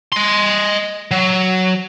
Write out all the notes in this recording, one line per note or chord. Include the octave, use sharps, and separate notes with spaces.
D#5 C6
F#3